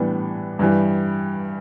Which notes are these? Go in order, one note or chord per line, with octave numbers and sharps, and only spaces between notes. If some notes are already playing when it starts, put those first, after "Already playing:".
Already playing: A2 E3 G3 B3 D4
G2 E3 G3